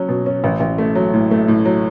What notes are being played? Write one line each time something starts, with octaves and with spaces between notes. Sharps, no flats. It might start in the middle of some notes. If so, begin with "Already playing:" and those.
Already playing: F#3 C#4
B2
C#4
A1
A1
A3
F#3
A2
A3
A2
F#3